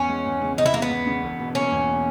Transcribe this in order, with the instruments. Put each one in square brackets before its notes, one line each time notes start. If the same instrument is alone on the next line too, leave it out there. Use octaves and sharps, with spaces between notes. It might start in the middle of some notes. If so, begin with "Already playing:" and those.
Already playing: [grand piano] E2 [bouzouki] C#4
[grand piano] G#3
E2
C#3
[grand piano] E2 [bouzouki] D#4
[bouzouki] E4
[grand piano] G#3 [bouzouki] A#3
[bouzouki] B3
[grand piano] E2
C#3
E1
B2
[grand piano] A#3 [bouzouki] C#4
[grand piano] E2